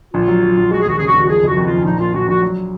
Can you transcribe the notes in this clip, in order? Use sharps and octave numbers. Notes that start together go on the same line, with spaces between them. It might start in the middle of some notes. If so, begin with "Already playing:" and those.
A#1 F4
F#3
F#3
A#1
G#3 F#4
G#4
D#2 F#4
C#3 G#4
F#4
D#2
F#4
F3 G#4
F#1 F#4
F2
F#4
F3 F4
C#4
A#1 D#4
A#2 F4
A#1 F#4
A#1 F#4
F#3